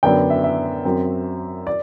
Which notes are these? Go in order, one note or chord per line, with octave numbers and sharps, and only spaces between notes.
F#2 D3 F#3 B3 D4 G5
E5
E5
F#2 F#3 C4
D5